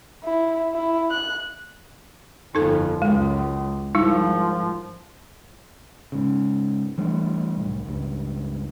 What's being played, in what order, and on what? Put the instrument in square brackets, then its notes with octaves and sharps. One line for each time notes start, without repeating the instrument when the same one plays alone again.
[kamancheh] E4
E4
F#6
[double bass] G1 F2 [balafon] D#4 A4
[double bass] C#2 F#2 [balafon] G#3
[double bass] G#1 F3 [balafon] G3 D#4 E4
[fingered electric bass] G#2 C#3
E3 G3 A3 D4
C2 A2
C#2 G2